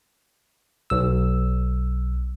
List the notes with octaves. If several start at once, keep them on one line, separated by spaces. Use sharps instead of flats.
B1 E6